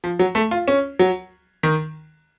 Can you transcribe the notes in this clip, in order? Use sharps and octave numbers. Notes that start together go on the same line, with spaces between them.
F3
F#3
A3
F4
C#4
F#3
D#3